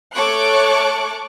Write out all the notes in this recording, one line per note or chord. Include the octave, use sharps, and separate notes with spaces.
A3 A4 C#5 C#6 D6 F#6